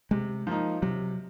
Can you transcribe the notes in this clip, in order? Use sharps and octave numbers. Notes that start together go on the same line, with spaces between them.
C3 G#3
F3 A#3 D#4
C3 F#3